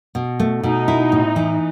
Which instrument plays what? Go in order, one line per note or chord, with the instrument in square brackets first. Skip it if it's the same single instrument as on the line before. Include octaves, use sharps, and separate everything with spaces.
[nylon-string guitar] B2
A3
[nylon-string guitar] B2 [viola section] D#4
[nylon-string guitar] E4
A2
E3